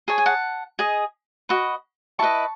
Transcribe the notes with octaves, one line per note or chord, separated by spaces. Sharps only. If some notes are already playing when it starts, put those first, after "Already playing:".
G#4 C#5 A5
G#5
F#5 A5
G#4 D#5
F#4 B4 D#5
E4 B4 D#5 A5 C#6